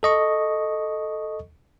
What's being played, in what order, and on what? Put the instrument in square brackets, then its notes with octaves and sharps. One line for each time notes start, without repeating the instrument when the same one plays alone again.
[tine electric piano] A4 D#5 C#6